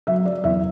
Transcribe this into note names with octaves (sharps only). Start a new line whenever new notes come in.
F#3 E5
F#3 D5
E2 E5